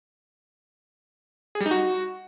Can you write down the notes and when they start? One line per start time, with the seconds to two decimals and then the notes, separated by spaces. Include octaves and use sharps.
1.55 G#4
1.60 G3
1.66 D#4
1.71 F#4